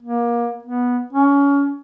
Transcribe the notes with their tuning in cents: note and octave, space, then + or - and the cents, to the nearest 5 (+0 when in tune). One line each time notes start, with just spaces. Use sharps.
A#3 +25
B3 -10
C#4 +25